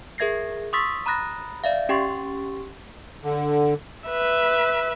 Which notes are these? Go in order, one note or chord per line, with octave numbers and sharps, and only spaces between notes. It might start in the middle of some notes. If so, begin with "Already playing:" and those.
G#4 A#4 E5 G#6 A#6 C7
C6 C#6 D#6 E6 A6 B6
A#5 B5 D#6 F#6 A6 A#6
D5 E5 F5
C#4 G4 G5 C6 C#6 A6
D3
B4 E5